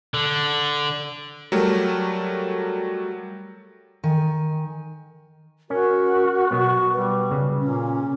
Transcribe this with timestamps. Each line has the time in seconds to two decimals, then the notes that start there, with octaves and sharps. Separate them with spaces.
0.14 D3
1.52 F#3 G3 A3 A#4
4.04 D#3 G#5
5.70 C#4 F#4 A#4
6.51 B2 F#3 B3 C#6
6.94 G3 B4
7.31 C#3
7.61 A#2 C#4